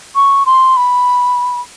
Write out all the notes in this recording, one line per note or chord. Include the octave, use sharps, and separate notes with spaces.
C#6
C6
B5